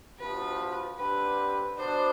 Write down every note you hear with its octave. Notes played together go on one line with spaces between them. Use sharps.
D2 C3 F3 B3 B4
D3 G3 C4 G4 B4
B2 B3 D4 C5